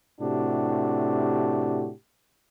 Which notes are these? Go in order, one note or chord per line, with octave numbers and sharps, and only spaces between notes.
A2 C3 D4 F#4 G4